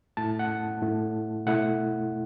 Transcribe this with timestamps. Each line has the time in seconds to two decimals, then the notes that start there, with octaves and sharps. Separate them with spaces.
0.17 A2 A3 E4 A5
0.39 F#5
0.82 A2 A3 E4
1.46 B2 A3 E4 F#5